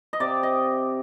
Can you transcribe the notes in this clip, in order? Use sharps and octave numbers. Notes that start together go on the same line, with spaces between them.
D#5
C3 D5
D#5